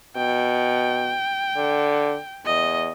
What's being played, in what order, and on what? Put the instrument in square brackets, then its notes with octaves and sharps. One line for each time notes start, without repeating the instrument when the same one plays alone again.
[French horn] B2 [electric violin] G5
[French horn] D3
[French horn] E2 [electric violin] D#5